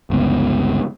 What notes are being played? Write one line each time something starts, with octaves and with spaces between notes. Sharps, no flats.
G1 C#2 B3